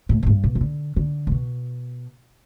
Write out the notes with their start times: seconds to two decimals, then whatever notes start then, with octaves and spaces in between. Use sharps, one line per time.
0.09 A2
0.23 A2
0.26 G2
0.44 B2
0.55 E3
0.61 D3
0.96 D3
1.27 A2
1.32 B2